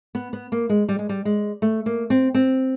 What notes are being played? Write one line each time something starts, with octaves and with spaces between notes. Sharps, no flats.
B3
B3
A#3
G#3
G3
G#3
G3
G#3
A3
A#3
C4
C4